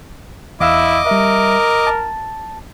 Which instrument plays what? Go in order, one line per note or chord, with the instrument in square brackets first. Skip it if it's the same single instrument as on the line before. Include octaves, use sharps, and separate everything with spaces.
[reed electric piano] E2 F5 E6 [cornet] E4 [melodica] D#5 D6
[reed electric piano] G3 E5 [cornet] A#4
[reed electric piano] A5